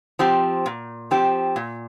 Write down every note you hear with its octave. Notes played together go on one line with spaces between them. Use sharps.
F3 C4 G4
A#2
F3 C4 G4
A#2